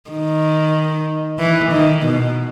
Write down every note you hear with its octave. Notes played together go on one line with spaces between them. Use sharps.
D#3
E3
D#3
B2